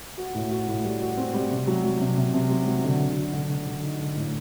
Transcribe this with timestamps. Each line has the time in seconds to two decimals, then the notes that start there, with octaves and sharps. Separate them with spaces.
0.18 F#4
0.35 A2
0.51 F#4
0.68 A2
0.85 G3
1.01 F#4
1.17 C4
1.34 G3
1.51 C3
1.67 F#3
1.84 F#3
2.01 C3
2.17 C3
2.34 C3
2.50 F#3
2.67 F#3
2.84 D3
3.00 D3
3.17 F#4
3.33 D3
3.50 D3
3.67 D3
3.83 D#4
4.00 D3
4.16 A2